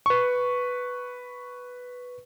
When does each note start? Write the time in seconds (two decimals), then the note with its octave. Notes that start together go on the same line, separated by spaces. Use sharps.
0.06 B4 C#6